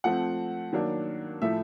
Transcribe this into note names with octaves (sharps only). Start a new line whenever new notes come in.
F3 A3 C4 F#5
D#3 F#3 A#3 D4
A2 F3 A3 E5